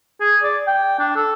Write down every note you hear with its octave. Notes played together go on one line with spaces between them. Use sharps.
G#4
D5
G5
D4
A4